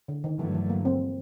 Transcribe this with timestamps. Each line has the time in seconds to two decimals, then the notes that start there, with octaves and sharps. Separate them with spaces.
0.08 D3
0.24 D#3
0.39 G2 D3 E3 F#3 A3
0.54 E3
0.70 A#3
0.85 C4